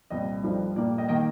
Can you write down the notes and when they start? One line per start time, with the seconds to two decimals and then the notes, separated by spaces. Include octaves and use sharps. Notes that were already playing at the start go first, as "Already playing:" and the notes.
0.10 C2 A#2 G3 D#5
0.43 G2 F3 A3
0.76 A#2 G3 A#3 D5
0.98 D#5 G5
1.08 D#3 A#3 D#5 G5